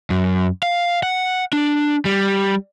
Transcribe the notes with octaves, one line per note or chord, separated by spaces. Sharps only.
F#2
F5
F#5
D4
G3